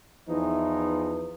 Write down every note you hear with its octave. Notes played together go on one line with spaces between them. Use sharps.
E2 E3 F3 D#4